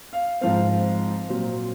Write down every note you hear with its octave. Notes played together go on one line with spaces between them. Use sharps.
F5
G#2 F3 C4 F5
A#2 F#3 C4